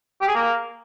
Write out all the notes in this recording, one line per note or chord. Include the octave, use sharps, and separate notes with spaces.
G4
G#4
A#3